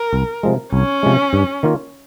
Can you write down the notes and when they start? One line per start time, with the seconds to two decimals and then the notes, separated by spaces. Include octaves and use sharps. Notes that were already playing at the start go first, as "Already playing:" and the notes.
Already playing: A#4
0.13 C2
0.43 C3 F3 G#3
0.73 C2 C#4
1.03 C3 F3 G#3
1.33 G2
1.63 D#3 A#3 F4